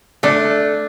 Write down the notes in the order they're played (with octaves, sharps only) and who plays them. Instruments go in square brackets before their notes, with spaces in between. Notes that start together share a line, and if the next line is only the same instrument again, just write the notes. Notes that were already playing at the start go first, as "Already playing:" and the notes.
[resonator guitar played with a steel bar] A3 [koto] D4